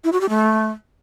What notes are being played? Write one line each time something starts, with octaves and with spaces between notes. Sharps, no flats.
E4
F#4
G4
A3